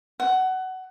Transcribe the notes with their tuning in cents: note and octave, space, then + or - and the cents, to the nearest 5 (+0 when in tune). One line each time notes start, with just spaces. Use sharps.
F#5 +20